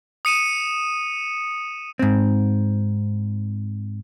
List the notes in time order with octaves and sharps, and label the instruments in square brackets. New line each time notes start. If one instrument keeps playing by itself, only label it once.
[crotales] D#6 C#7 D#7 E7
[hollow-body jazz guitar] G#2 C4